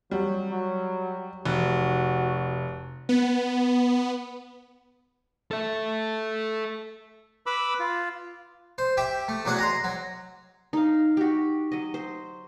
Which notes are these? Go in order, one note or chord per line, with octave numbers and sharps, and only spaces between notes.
F#3 G3
F#3
F1 F#4
B3
A4 E5
B4 B5 D6 E6
F4
C5
G4 E5 G5
A3
E2 F#3 D4 G#4 F#5
D#5 A#5 C6
F#3
D#4 F5
F#4 G4
F#3 D#5
C5